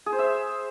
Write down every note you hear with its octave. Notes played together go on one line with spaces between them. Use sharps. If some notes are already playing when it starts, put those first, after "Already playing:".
G#4
C5
E5